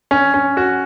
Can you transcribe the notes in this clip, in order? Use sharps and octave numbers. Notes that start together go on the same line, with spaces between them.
C#4
C#4
F#4